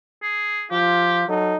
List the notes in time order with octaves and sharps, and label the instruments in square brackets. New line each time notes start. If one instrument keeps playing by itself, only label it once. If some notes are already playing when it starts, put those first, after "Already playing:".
[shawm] G#4
[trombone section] F3 F4 [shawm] G4
[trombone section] F#3 D#4 A4